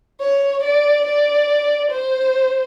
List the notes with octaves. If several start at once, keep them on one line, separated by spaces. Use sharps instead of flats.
C#5
D5
D5
C5